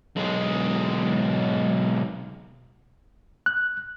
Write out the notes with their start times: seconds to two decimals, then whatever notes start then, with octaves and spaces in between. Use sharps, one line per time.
0.16 B1 G#3
3.46 F#6